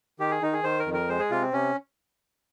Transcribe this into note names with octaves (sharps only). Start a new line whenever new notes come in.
D#3 G4
G#4
D#3 D#4
G#4
D#3 C5
A#4
F2
A#4
G#3 C5
G#4
C3 F4
C4
C3 C#4